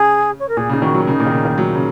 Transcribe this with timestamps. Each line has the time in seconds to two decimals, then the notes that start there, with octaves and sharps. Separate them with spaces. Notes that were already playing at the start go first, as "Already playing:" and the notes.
Already playing: C#3 G#4
0.39 C#5
0.48 A#4
0.57 A#2 G#4
0.69 C#3 D#4
0.82 D#3 F#4
0.94 F#3
1.07 C#3 D#4
1.20 A#2
1.26 D#3
1.32 C#3
1.45 D#3
1.58 F#3
1.75 C#3